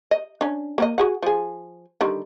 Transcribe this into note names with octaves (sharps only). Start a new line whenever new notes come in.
D#5
C#4 D4
A#3 C4 D#5
F#4 G#4 F#5
F3 G#4
D3 D#3 G3